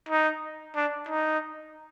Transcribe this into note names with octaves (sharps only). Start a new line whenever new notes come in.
D#4
D4
D#4